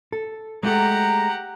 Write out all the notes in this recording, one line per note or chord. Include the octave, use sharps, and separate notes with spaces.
A4
G#3 A3 G4 A4 F#5 A#5